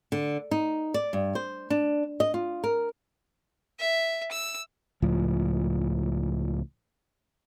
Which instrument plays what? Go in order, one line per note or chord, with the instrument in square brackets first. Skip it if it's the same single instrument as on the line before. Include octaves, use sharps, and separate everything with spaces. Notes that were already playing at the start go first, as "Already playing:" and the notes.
[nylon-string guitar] D3
D#4
D5
G2
C5
D4
D#5
F4
A#4
[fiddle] E5
E6
[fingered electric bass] C#2 A2 F3